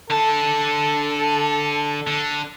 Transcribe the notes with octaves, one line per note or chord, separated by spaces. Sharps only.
D3 A4 A5
D3